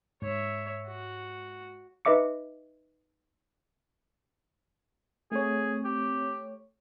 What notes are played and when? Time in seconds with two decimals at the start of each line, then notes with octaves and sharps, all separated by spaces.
0.22 G#2 C#5 E5
0.87 F#4
2.05 D#4 B4 D#5 E5 D6 C#7
5.32 A3 C4 G#4 C#5
5.85 G4